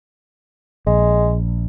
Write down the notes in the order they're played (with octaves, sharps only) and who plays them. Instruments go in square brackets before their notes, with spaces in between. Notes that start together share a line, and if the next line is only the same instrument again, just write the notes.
[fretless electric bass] A#1 [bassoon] G#3